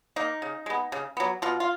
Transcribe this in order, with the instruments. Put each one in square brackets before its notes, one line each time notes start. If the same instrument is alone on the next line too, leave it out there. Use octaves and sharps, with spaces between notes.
[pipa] A#3 D#4
C#3
G#3 B3
C#3
F#3 B3
B2 F4
F4